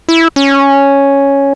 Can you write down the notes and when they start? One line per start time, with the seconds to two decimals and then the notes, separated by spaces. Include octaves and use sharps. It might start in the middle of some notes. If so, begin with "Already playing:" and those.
0.09 E4
0.36 C#4